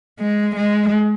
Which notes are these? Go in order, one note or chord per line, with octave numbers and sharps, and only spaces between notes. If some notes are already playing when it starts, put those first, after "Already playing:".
G#3
G#3